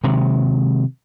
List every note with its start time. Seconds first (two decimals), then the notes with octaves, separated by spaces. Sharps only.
0.04 C3 D#3 F#3 G#3